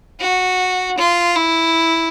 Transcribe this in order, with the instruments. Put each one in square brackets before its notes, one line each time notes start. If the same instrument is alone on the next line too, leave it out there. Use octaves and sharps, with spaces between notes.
[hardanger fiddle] F#4
F4
E4